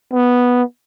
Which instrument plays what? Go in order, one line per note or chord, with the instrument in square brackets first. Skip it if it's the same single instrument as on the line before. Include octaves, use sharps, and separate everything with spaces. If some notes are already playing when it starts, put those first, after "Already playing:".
[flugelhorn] B3